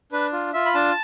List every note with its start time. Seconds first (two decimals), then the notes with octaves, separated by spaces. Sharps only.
0.12 D4 B4
0.33 F4
0.54 F4 E5
0.65 B5
0.74 D4 A5